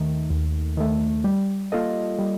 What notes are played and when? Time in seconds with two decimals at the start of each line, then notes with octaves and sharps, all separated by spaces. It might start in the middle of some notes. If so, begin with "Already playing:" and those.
Already playing: D#2 D#3 A3
0.30 D#2
0.77 D#3 A3
1.24 G3
1.72 A#3 F4 A4 D#5
2.19 G3